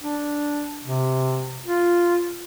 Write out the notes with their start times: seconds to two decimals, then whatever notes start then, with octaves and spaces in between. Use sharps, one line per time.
0.02 D4
0.84 C3
1.66 F4